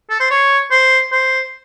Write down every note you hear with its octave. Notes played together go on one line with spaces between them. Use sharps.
A4
C5
C#5
C5
C5